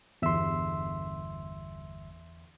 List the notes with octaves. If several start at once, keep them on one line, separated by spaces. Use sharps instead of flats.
G1 E2 E5 C6 E6